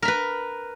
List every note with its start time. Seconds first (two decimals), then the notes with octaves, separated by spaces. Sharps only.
0.02 A#4
0.05 B5
0.08 B4